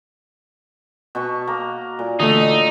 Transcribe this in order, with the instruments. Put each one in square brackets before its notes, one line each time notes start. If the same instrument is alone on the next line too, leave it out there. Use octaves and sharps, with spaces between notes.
[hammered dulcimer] B2 A5 C#6
A#3 A#5
A#2
[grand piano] D3 A3 D#5 [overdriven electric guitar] D#4